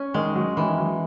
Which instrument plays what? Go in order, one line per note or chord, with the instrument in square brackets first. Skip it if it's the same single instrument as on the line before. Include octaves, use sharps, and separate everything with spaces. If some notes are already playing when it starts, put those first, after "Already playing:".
Already playing: [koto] C#4
[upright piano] D#3 [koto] G#3
[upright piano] F#3
[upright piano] D#3 [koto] E3
[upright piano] F#3